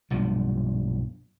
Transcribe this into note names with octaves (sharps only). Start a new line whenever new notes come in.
B1 G2 A#2 F3